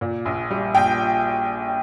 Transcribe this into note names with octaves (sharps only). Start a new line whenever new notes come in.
A#2
A#1
G3
A#1 G5